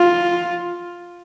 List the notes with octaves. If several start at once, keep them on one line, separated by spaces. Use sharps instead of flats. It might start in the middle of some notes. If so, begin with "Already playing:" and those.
Already playing: F4